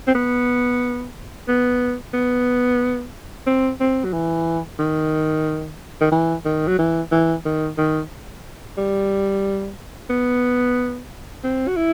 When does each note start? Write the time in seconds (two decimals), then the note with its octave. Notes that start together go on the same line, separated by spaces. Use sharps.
0.08 C4
0.15 B3
1.48 B3
2.13 B3
3.47 C4
3.80 C4
4.04 F#3
4.13 E3
4.79 D#3
6.01 D#3
6.12 E3
6.45 D#3
6.68 F#3
6.79 E3
7.11 E3
7.45 D#3
7.78 D#3
8.78 G3
10.10 B3
11.44 C4
11.67 F#4
11.76 E4